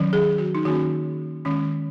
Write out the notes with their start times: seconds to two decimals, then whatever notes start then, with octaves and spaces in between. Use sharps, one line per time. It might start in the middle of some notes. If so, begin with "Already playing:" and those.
Already playing: D#3 F#3 C#4
0.13 G#4
0.38 F#4
0.55 D#4
0.65 D#3 A#3 C#4 F#4
1.45 D#3 G#3 C#4